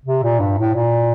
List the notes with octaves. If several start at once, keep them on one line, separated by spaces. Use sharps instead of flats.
C3
A#2
G2
A2
A#2